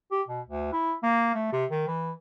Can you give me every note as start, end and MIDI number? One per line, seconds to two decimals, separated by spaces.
0.11 0.22 67
0.28 0.41 47
0.47 0.68 38
0.72 0.94 64
1.03 1.30 58
1.34 1.51 57
1.52 1.65 48
1.71 1.84 51
1.87 2.11 52